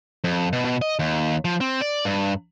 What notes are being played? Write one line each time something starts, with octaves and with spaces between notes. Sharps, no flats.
F2
B2
B2
D#5
D#2
F3
C4
D5
G2